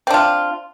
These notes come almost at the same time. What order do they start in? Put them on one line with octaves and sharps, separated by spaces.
C4 D4 F4